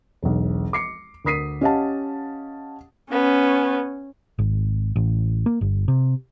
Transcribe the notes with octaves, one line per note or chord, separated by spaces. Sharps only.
E1 B1
D6 C7 C#7
D2 A#4 D#6 B6 C7 D#7
C#4 G4 D#5 F5 F#5 A5
B3 C#4
G#1
A1
A#3
G1
C3